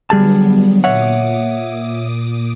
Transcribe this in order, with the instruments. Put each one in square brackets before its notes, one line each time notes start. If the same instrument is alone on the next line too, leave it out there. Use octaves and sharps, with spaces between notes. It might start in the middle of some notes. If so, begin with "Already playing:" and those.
[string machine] D3 F#3 B3 [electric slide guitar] G3 G#4 A5
[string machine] A#2 D6 D#6 [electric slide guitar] C#5 E5 F#5